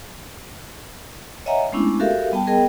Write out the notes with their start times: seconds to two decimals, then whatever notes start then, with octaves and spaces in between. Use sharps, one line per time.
1.46 C#5 D#5 E5 F#5 G#5 A#5
1.73 G#3 A3 B3 C#4 D4 E4
2.00 F#4 G4 A4 A#4 E5 F5
2.32 G3 B3 G5 A5
2.47 B3 G#4 A#4 D#5 G5